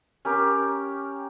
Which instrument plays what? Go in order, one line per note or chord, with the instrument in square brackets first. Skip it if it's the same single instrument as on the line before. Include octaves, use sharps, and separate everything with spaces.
[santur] C#4 G4 A#4